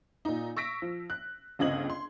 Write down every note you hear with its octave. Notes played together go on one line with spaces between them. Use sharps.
A#2 D#4
C#6 E6 A#6 B6 D7
F3
F#6
G1 C#2 C4 D#5 G#6 F#7
C6